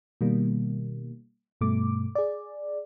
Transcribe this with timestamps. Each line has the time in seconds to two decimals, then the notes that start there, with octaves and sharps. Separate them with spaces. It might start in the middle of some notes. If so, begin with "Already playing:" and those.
0.21 B2 D#3 G3 A#3
1.61 G2 B2 A3 D6
2.15 G#4 D5